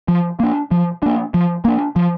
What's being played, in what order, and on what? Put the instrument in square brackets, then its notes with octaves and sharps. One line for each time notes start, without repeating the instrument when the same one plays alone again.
[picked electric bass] F3
A#3 D4
F3
A#3 D4
F3
A#3 D4
F3